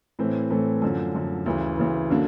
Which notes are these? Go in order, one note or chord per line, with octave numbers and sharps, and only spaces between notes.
A2 E3 A3 C4
A2 E3 A3 C4
F#2 D3 F3
F#2 D3 F3
D2 C#3 E3
D2 C#3 E3
D3 F#3 A#3 D4